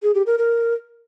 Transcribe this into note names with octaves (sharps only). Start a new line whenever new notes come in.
G#4
G4
A#4
A#4